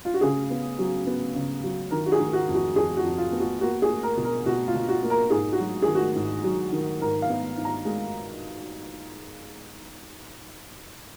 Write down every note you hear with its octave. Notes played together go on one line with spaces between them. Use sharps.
F4
F#4
C#3 G#4
B3
F#3
B3
C#3
F#3
D#3 A#4
F#4
G#4
D#3
F#4
F2
F#4
F2 G#4
F#4
F2
F4
B3
F#4
A#3 F#4
G#4
A#3
A#4
B2
A#4
B2 F#4
F4
B2
F#4
A#3
A#4
G#2 G#4
F#4
F#3
D#3 G#4
F#4
G#2
F#3
D#3
G#2 A#4
F5
B3
G#2
A#5
G#3